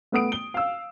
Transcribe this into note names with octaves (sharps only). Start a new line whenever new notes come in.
A3 B3 D#6 D7
G7
F5 E6